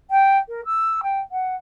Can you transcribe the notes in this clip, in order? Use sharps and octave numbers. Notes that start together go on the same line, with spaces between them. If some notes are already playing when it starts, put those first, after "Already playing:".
G5
A#4
E6
G5
F#5